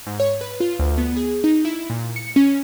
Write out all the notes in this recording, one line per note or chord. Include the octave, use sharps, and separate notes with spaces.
G#2
C#5
B4
F4
D2
B3
G#4
D#4
E4
A#2
C#7
C#4